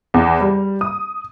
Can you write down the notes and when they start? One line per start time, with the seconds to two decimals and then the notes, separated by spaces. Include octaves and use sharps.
0.14 E2
0.41 G3
0.81 D#6